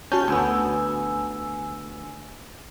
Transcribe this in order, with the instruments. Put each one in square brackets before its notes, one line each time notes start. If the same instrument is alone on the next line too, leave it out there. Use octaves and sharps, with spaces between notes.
[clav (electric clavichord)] C#4 [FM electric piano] F#4 A5 G6
[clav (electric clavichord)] D2 B3 [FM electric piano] G#5 E6